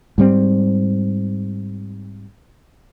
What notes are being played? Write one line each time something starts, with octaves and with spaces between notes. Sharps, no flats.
G#2 G3 C4